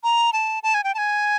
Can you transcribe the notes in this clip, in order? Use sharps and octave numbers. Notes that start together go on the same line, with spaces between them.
A#5
A5
A5
G#5
G5
A5
G#5